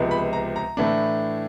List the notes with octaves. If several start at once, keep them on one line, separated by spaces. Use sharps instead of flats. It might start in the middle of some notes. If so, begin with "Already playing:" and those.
Already playing: C#2 C3 F3 G#3 B3
B5
A#5
A#5
A2 E3 A3 D4